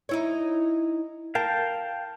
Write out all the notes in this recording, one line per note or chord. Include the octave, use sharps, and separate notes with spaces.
D#4 E4 C#5
A#4 F5 G5 A5